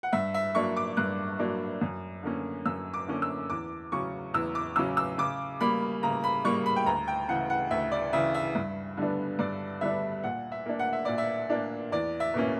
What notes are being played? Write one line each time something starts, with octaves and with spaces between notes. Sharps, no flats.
F#5
G2 E5
E5
F#3 A#3 D4 C#6
D6
G2 F#6
F#3 A#3 D4
F#2
D3 A#3 C#4
F#2 E6
D6
D3 A#3 C#4
E6
E2 D6
C#3 F#3 C#4 C#6
E2 E6
D6
C#3 F#3 C#4 E6
E6
C#3 D6
G3 A#3 B5
C#3 A#5
B5
G3 A#3 C#6
B5
G5
D2 A#5
G5
C#3 E3 F#5
F#5
D2 E5
D5
C#3 E3 E5
E5
G2
D3 G3 B3 D4
G2 D5
D3 G3 B3 D4 E5
A#2 F#5
E5
A#3 D4
F#5
E5
A#2 D5
E5
A#3 D4
E2 D5
E5
B2 A#3 C#4